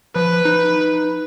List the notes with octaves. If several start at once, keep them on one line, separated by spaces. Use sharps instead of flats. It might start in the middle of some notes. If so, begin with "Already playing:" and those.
F3 B4
D#4